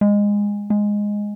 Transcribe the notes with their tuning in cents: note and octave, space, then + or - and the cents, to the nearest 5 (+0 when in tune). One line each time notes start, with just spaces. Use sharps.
G#3 -20
G#3 -5